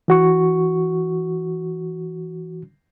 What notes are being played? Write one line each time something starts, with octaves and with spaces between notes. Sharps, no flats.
E3 F#4 C#6